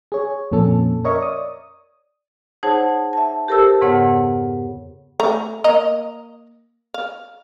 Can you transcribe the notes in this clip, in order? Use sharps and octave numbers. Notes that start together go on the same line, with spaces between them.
G#4 C#5
F2 A#2 C#4 A4
A#4 C#5 D#5 E5 C#6
D5 D#6
D#4 G#4 C5 C#5 F#5 A5
E5 A5
G4 A4 A#4 C5 A5 E6
F2 G#2 C#3 B3 C#5 F#5
A3 A#5
A#3 D#5 A#5
F5